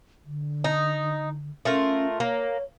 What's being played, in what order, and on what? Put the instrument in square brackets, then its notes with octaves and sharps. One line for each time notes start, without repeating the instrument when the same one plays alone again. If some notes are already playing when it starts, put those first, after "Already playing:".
[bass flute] D3
[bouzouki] D#4
[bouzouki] A3 F4 A#4 [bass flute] C#4
[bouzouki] A#3 [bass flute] C#5